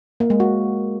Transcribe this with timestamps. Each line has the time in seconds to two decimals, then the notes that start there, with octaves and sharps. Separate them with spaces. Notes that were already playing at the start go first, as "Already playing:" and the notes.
0.20 A#3
0.30 G#3
0.40 F#4